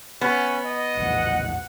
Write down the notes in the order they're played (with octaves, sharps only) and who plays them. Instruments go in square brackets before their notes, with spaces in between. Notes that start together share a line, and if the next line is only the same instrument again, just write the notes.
[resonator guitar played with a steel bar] B3 [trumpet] C#4
[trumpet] D#5
[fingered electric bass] A#1 E2 A2 [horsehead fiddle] F#5